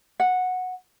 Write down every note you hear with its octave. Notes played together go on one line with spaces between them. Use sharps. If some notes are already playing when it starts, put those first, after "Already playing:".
F#5